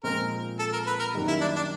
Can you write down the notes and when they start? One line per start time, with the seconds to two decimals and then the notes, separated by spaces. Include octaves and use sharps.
0.03 A#2 F3 G#3 C4 A#4
0.59 A4
0.73 A#4
0.87 B4
1.00 A#4
1.14 F#2 D#3 G3 A#3
1.28 E4
1.41 D4
1.56 D4